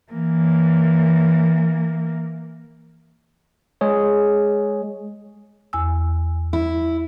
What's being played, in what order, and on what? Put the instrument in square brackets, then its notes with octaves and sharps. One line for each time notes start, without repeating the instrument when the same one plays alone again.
[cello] E3 A#3
[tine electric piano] G#3 G#4 C#5
[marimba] E2 G#5 E6
[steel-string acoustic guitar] E4